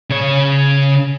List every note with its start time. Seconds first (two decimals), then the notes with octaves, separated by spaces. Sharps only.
0.10 C#3 C#5